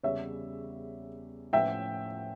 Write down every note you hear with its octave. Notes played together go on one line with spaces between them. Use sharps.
E2 C#3 G3 C#5 E5
A2 F3 C#4 E5 G5